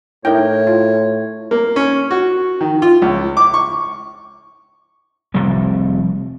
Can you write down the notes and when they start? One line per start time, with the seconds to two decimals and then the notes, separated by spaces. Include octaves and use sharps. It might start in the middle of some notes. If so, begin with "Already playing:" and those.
0.25 A2 D#4 E4 A#4 C#5 E5 G5
0.67 F4
1.51 A#3
1.76 C#4
2.11 F#4
2.61 D#3
2.82 F4
3.02 C#2
3.37 D6
3.54 C#6
5.34 F1 C3 F3 G3